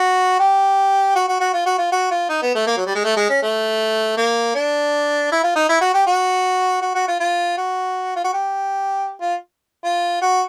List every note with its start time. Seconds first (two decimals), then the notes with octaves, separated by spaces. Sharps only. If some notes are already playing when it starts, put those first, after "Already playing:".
Already playing: F#4
0.40 G4
1.15 F#4
1.29 F#4
1.40 F#4
1.53 F4
1.66 F#4
1.79 F4
1.92 F#4
2.11 F4
2.29 D#4
2.42 B3
2.55 A3
2.67 A#3
2.77 F#3
2.86 G3
2.95 G#3
3.04 A3
3.17 G#3
3.30 C#4
3.42 A3
4.17 A#3
4.55 D4
5.32 E4
5.44 F4
5.56 D#4
5.69 E4
5.81 F#4
5.94 G4
6.07 F#4
6.81 F#4
6.95 F#4
7.08 F4
7.20 F4
7.58 F#4
8.16 F4
8.24 F#4
8.34 G4
9.21 F4
9.84 F4
10.22 F#4